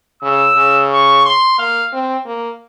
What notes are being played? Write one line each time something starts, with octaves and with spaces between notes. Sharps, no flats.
C#3 E6
C#3
C#6
C6
A#3 F5
C4
A#3